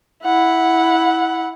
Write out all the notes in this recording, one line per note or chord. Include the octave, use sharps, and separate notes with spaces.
E4 F#5